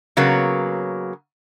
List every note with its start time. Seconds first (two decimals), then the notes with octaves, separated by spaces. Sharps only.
0.17 C#3 F#3 A#3 B3